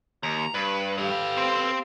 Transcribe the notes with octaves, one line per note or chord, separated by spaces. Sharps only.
D#2 A#5
G2 B4
G4 A4 B4 F5
C4 C5